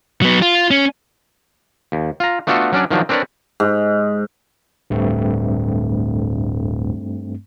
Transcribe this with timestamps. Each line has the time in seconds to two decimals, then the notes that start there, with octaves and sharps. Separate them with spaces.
0.22 F#3 B3
0.42 F4
0.71 C#4
1.92 D#2
2.20 F4 A#5
2.47 A3 B3 D4 F4 F#4 A4
2.72 F#3 C#4 D4 D5
2.91 D#3 F3 F#3 D4
3.09 C4 D4 A#4 B4 C#5 D5
3.60 G#2
4.90 D1 G2 A3 C4